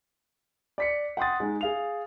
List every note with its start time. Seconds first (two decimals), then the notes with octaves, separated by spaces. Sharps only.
0.78 D5 B6 C#7
1.17 F#5 G5 C6 D#6 A6
1.40 G#3 D#4
1.61 G#4 F5 F7